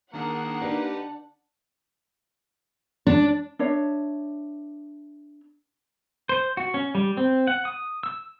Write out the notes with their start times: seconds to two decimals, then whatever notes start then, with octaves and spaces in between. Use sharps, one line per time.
0.14 D#3 A#3 D4 G#4 F#5
0.62 D4 D#4 G4 B4
3.07 D4
3.59 D4 C#5 E5
6.29 C5
6.57 F#4
6.74 C#4
6.95 G3
7.17 C4
7.47 F#5
7.65 D#6
8.03 E6